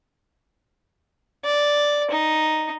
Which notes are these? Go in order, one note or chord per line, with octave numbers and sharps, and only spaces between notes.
D5
D#4